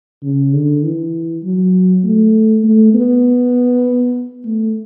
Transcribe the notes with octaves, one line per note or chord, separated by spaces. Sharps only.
C#3
D3
E3
F#3
A3
A3
B3
A3